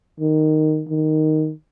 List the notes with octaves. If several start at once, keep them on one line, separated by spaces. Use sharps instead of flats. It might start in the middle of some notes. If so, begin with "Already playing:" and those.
D#3
D#3